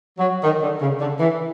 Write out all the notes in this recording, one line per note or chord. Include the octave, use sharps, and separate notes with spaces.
F#3
D#3
D3
C#3
D3
E3